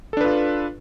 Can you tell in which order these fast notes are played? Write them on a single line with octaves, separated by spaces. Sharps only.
A4 D4 B4 F4